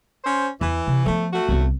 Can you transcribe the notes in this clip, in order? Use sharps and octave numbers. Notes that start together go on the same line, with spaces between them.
C#4 C5
E2 E3
C3
F3 A3 B3
A3 F#4
C2 B3